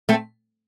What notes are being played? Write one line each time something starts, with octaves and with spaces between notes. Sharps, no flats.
A3 C4